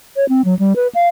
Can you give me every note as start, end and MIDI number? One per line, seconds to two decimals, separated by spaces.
0.16 0.28 73
0.29 0.44 60
0.45 0.58 54
0.59 0.76 55
0.76 0.88 71
0.95 1.08 77